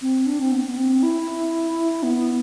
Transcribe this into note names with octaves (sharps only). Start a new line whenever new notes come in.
C4
D4
C4
B3
B3
C4
E4
B3